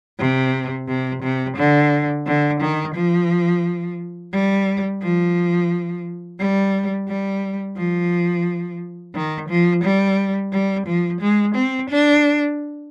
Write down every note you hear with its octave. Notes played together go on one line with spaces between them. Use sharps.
C3
C3
C3
D3
D3
D#3
F3
G3
F3
G3
G3
F3
D#3
F3
G3
G3
F3
G#3
C4
D4